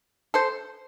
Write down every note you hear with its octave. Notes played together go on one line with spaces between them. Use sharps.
A4 C5